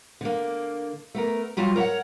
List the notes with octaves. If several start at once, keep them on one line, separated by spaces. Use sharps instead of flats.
D3 A#3
A3 B3 A#4
F#3 G3 F4 F#4
A#4 C#5 E5 F#5